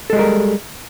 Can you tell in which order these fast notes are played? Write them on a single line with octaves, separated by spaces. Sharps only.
A4 G#3 G3 A#4